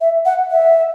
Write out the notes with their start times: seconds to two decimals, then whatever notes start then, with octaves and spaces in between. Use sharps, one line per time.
0.01 E5
0.25 F#5
0.51 E5